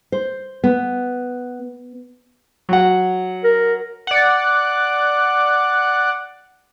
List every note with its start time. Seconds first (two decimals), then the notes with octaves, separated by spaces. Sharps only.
0.12 C5
0.64 B3
2.69 F#3 F#5
3.44 A#4
4.07 D5 F#5